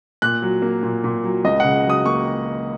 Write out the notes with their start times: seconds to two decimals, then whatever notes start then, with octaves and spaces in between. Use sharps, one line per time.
0.22 A#2 F#6
0.42 F#3
0.62 A#3
0.83 A#2
1.04 A#2
1.24 F#3
1.45 C#2 D#5
1.60 C#3 F#5
1.84 F#3
1.90 D#6
2.05 A#3 C#6